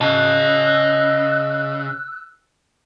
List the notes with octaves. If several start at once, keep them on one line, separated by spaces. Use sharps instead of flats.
C#3 D#5 A5 E6 F#6